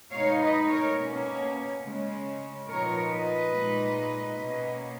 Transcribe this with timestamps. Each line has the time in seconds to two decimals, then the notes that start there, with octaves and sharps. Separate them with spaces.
0.11 B2 G#3 D#4 C#5 F5
0.40 B4 D#5
0.68 A#4 C#5
0.96 B2 A#3 C#4
1.82 C#3 G#3 C#4
2.66 A#2 F3 B3 D#4 A#4 C#5
3.09 B4 D#5
3.52 A#2 G#3 D#4
4.37 B2 A#3 C#4